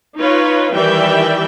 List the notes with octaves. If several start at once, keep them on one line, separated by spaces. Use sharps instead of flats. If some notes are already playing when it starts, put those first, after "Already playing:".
D#4 F4 B4 C#5
D#3 E3 G3 D5 E5 G5